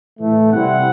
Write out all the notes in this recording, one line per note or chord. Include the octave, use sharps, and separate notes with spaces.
A2 E3 A3
C3 G3 C4 E4 F#5